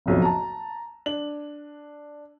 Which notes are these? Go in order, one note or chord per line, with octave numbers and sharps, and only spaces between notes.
F#1 B1 F2
A5 A#5
D4 F#7